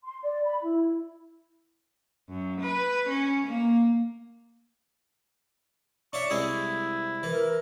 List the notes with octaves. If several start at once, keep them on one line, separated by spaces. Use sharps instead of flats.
C6
D5
B5
E4
F#2
B4
C#4
A#3
D4 C#5 E5 C#6
C2 G#3 E4 G#4
E3 A#4